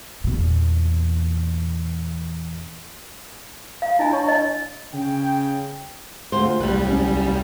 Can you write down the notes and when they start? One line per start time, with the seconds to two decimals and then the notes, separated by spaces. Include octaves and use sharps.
0.24 E2 A#2
3.82 F5
3.98 D4 E4 D#5 G#5 B5
4.13 C#5 A5 C#6
4.26 E4 D#5
4.93 C#3 G5
6.32 D2 F4 C5
6.60 C2 G3 B4
6.87 C#4